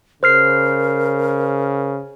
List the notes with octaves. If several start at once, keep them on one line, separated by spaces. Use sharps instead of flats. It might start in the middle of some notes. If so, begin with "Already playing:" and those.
C#3 A#4 C5 F6 C7